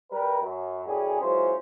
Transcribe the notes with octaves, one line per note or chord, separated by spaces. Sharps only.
G3 A#4 B4
F#2
A1 F#2 G3 C#4 G#4
E3 F#3 G#3 C#4 F4 C5